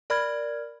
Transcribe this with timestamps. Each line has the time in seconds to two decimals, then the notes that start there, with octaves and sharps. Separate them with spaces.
0.10 A#4 D5 B5 F6 G#6